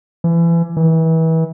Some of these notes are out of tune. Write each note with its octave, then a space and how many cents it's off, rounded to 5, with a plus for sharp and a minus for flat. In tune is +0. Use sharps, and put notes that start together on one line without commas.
E3 +30
E3 -30